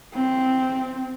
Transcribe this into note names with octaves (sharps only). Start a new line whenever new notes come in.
C4